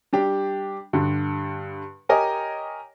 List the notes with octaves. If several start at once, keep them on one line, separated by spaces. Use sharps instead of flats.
G3 D4 G4
G2 D3
G4 A#4 C#5 D#5 G#5